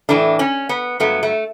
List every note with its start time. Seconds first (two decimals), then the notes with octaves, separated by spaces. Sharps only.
0.09 A2 E3 A3 D4
0.39 C#4
0.69 B3
1.00 G2 F#3 A3 B3
1.23 A3